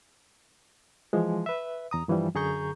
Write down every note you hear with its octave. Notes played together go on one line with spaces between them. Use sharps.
E3 F3 G#3
B4 E5
E2 A#5 D#6
G2 E3 F3 G3
F#2 D3 G#4 A#5 C#6 G6